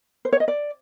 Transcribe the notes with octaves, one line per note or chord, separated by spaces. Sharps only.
C5
C#5
D#5
D5